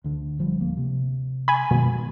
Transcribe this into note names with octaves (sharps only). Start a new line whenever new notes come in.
D2 D3
F#1 F3 G3
D1 A#3
C3
G#5 B5
F#2 B2 D#3 G#3